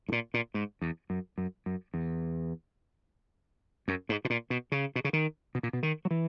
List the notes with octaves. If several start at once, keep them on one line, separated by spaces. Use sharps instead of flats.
G#2
A#2
A#2
G#2
E2
F#2
F#2
F#2
E2
F#2
G#2
B2
A#2
B2
C#3
B2
C#3
D#3
B2
A#2
B2
D#3
F#3
E3